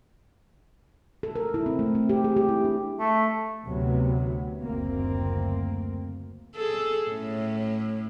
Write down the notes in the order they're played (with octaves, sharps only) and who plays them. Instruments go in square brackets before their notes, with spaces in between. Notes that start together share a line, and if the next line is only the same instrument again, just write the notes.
[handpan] A4
A#4
E4
C4
A3
C4
G4
G#4
G4
E4
D4
[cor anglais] A3
[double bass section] D2 C3 F#3 B3
F#1 D2 A#3 C4
[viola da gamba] G#4 A4
A2 C#4